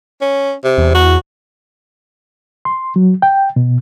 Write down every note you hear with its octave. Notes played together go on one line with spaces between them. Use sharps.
C#4
C3
E2
F#4
C6
F#3
G5
B2